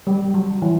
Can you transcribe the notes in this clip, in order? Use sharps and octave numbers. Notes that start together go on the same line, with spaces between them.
G3
F#3
E3